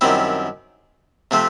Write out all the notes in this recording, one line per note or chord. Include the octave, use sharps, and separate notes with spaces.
F#2 D#3 G3 C4 E4
C3 F3 A3 C4